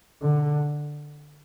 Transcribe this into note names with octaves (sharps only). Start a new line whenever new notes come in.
D3